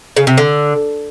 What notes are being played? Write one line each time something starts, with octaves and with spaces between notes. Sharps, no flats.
C#3
C3
D3